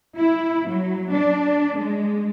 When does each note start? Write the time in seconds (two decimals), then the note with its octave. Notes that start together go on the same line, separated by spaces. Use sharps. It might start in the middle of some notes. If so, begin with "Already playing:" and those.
0.17 E4
0.68 F#3
1.12 D4
1.76 G#3